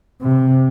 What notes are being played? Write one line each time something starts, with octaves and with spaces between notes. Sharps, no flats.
C3